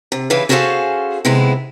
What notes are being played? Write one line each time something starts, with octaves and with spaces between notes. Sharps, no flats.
C3
C#3 E3 E4 B4 F5
C#4 F#4 G#4 A4 C5 F5
C3 D#3 G#3 B3 E4